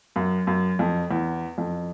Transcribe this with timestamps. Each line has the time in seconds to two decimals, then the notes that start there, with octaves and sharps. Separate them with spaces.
0.16 F#2
0.47 F#2
0.79 F2
1.11 E2
1.58 F2